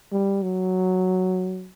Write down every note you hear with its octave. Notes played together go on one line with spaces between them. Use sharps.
G3
F#3